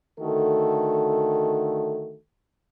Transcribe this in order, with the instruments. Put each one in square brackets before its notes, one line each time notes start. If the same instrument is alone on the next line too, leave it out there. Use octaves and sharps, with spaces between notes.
[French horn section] D3 D#3 A3 F#4 A4